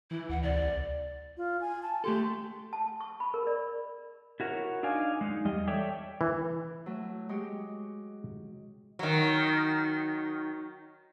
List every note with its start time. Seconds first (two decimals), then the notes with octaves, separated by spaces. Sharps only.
0.11 E3 E4
0.29 D2 F#5
0.43 C3 D5
0.56 C2
1.37 F4
1.61 G#5
1.83 A5
2.04 A3 G4 A4 C6
2.73 A5
3.01 C#6
3.20 B5
3.34 A#4
3.47 D5
4.40 E4 F#4 A#4 C#5
4.83 D4 D#4 D5 F5 G#5
5.21 G#3 D#4
5.45 E2 G3 D#5
5.67 A4 C#5 D5 E5 G5
6.21 E3
6.86 F#3 A3
7.29 G#3 F#4 G4
8.99 D#3 F#3